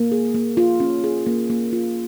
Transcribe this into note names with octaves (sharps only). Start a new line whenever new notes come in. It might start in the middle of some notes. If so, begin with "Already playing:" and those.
Already playing: A#3
G#4
A#3
F4
C#4
G#4
A#3
A#3
F4